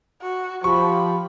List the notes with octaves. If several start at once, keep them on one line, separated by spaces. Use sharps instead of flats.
F#4
F3 G4 B5 C#6